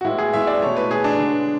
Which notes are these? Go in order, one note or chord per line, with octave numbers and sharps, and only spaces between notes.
F#4
A2 G#3 B3 E4
G#4
A2 G#3 B3 E5
D5
B2 A3 C#5
B4
B2 A3 G#4
D4
D3 G#3 B3